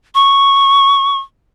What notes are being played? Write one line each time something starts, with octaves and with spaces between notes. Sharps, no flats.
C#6